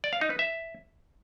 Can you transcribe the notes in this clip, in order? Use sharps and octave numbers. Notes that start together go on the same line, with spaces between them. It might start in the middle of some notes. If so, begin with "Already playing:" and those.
D5
F5
D#4
B4
E5